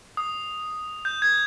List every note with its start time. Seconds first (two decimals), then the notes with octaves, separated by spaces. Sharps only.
0.17 D#6
1.05 G6
1.22 G#6